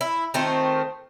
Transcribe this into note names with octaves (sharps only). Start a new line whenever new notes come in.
E4
D#3 A3 C4 F4